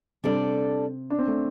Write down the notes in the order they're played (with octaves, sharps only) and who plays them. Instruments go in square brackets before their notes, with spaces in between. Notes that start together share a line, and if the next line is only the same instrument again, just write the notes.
[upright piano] C3 C4 [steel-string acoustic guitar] G3 D4 A4 D5
[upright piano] D4
C4
A3